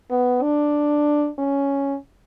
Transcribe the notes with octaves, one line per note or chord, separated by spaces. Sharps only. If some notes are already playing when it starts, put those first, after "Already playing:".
B3
D4
C#4